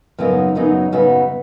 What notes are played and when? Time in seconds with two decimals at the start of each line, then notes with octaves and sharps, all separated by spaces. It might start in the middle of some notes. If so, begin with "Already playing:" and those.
0.18 F#2 C#3 F#3 B3 D#4
0.55 F#2 C#3 F#3 B3 D#4
0.92 F#2 C#3 F#3 B3 D#4